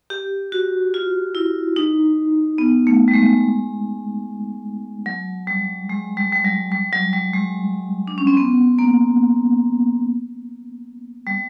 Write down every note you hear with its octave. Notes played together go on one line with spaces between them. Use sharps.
G4
F#4
F4
E4
D#4
B3
A3
G3
G#3
F#3
G3
G#3
G3
G3
F#3
G3
F#3
G3
G#3
D4
C#4
C4
B3
A#3
G3